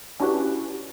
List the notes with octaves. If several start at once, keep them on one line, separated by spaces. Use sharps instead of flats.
C#4 D4 E4 F#4 G4 B4